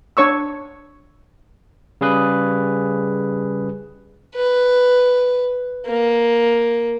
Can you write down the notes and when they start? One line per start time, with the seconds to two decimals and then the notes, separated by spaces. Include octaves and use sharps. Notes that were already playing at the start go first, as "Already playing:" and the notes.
0.17 D4 C#5 C#6 E6
2.01 C#3 G3 G#4 B4
4.35 B4
5.86 A#3